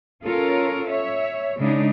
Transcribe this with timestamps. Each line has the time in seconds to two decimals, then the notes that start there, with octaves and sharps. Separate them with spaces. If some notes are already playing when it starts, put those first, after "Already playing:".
0.24 C#4 F4 A4 A#4 C#5
0.87 C#5 E5
1.59 C#3 G#3 D4 D#4